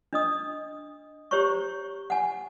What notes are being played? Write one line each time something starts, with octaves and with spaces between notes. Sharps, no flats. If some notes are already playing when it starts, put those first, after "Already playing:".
D4 D#5 D#6
G4 C5 C#5 A#5 C#6
F#5 G#5